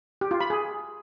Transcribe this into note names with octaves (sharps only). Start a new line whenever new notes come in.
G4
F4
B5
G#4